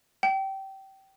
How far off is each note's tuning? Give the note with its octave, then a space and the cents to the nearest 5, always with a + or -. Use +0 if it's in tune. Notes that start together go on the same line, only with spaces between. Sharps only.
G5 -20